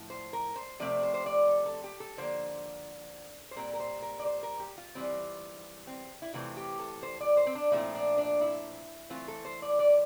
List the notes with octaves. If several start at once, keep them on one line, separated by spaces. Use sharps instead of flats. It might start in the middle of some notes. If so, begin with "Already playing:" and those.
Already playing: A2 F3
C5
A#4
C5
C3 F3 A3 C4 D5
C5
C5
D5
A4
A4
G4
A4
D3 F3 A#3 C5
C5
A#2 G3 C4 A#4
A#4
C5
A#4
D5
C5
A#4
G4
F4
E3 G3 C4
C4
E4
C3 E3 A3 C4 F4
G4
A4
C5
D5
C5
C4
D4
A#2 F3 A3 C4 E4
D4
D4
E4
E3 A3 C4 F4
A4
C5
D5
D5